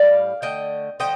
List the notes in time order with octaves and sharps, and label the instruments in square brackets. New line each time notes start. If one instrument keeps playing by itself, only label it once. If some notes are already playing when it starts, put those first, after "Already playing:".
Already playing: [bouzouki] A2 G3 D5 F5
D3 A3 D#5 G5
D3 F3 A3 D#5 G5